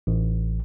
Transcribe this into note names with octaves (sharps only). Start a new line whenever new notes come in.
A1